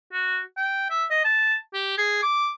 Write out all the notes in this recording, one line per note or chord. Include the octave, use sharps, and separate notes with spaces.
F#4
G5
E5
D#5
A5
G4
G#4
D6